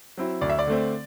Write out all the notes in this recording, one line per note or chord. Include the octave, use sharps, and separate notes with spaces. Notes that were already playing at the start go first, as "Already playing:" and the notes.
F#3 C4 E4
D2 D5
E5
D5
D3 A3 C4